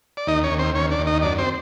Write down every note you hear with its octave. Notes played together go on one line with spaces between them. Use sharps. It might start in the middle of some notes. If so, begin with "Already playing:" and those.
D5
D#2 D#4 D#5
C#4 C#5
D#2
C4 C5
D#2 C#4 C#5
D4 D5
D#2
D#4 D#5
F#2 D4 D5
C4 C5